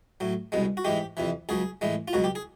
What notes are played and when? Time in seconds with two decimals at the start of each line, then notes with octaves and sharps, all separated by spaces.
0.20 A2 F#3
0.52 C2 B2 G#3
0.77 F#4
0.85 G#2 E3 G#3 G4
1.17 F2 C3 E3
1.49 C#2 C#3 F#3 G#4
1.81 A2 E3 G#3
2.08 F4
2.13 C#2 B2 F#3 F#4
2.24 G4
2.35 G#4